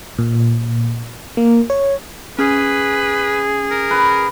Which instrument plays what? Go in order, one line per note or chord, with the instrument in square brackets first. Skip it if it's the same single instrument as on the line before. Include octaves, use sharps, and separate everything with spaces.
[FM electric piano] A#2
A#3
C#5
[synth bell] C#4 [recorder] G#4 [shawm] B4
[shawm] A#4
[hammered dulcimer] B4